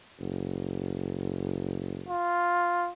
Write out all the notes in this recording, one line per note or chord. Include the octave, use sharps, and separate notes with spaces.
F#1
F4